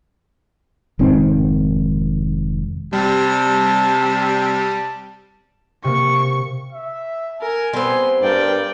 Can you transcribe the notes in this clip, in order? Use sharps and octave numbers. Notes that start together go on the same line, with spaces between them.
F1 G#2 D#3 C4
C3 G3 A5
C3 A#3 C#6
E5
A#4 G#5
G3 B3 C4 C6
G2 A#4 D5 G5